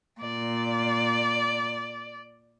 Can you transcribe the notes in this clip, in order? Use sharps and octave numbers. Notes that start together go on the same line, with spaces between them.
A#2 D5